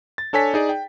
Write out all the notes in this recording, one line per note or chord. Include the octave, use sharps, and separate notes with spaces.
A6
D4 A4 C#5 G#5 B6
D#4 G#4 D5
G5